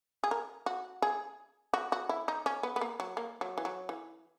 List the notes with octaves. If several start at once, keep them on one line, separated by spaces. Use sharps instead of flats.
G#4
A#4
F#4
G#4
F#4
F#4
E4
D#4
C#4
B3
B3
A#3
F#3
A#3
F#3
E3
F#3
E3